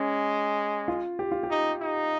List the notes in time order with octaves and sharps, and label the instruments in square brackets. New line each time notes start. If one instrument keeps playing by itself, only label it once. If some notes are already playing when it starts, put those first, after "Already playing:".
Already playing: [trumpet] G#3 [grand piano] C#4
[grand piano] F4
G4
F4
G4
[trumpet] D#4
D#4